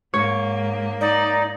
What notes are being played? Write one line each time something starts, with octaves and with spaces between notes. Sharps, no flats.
G#2 A#3 C#5
D#4 D5